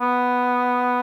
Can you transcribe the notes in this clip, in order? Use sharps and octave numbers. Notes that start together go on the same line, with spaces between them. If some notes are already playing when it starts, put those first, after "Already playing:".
B3